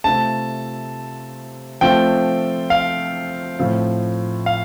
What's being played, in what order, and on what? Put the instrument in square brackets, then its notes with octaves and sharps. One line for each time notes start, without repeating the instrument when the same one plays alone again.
[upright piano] C3 A3 C4 F4 [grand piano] A5
[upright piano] F3 A3 C4 F4 [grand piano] G5
[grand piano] F5
[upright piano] A2 F3 C4 F4
[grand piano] F5